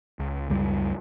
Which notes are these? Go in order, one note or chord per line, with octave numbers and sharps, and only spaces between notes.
C#2
C#2 F#2 G3